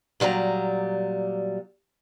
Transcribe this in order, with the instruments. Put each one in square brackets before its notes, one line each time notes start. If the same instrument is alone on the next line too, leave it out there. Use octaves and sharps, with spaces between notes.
[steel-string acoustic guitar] A#2 F#3 G3 D5 A#5